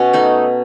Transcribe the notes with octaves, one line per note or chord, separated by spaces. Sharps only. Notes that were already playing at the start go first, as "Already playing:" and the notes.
Already playing: B2 B3 C#4
A3 D#4